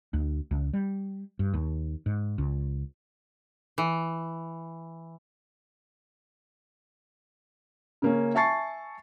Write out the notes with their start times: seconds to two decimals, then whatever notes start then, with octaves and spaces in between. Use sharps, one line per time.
0.13 D2
0.51 C#2
0.73 G3
1.39 G2
1.54 D#2
2.06 G#2
2.38 C#2
3.78 E3
8.02 C#3 A#3 C#4
8.35 E5 G#5 A5 C#6 A6 C7